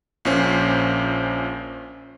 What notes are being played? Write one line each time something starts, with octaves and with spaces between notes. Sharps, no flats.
A#1 A#2 C#4 C5